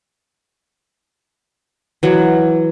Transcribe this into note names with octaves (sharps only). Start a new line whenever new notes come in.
E3 F#3